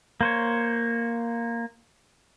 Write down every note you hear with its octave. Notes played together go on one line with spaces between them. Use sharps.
A#3 C5 C#5